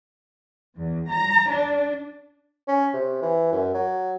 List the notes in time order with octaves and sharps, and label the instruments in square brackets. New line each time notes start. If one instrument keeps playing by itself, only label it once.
[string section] E2
A#5
D4
[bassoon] C#4
C3
E3
F#2
F#3